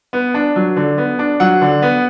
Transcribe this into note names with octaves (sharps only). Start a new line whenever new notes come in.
B3
D4
F#3
D3
B3
D4
F#3 F#5
D3
B3